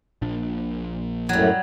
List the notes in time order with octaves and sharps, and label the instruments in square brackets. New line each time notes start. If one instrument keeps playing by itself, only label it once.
[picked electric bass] A#1 A#2 D4
[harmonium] F#2 A2 [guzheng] F#3 G3